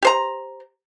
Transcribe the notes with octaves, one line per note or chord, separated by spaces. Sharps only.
G4 C5 A#5